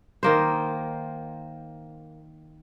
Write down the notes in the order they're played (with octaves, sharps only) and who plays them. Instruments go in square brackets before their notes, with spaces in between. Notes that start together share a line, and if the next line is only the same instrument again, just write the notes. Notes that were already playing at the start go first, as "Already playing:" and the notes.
[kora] D#3 A#3 C5